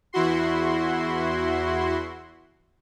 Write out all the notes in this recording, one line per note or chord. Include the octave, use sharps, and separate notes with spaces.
E2 E4 F#4 C6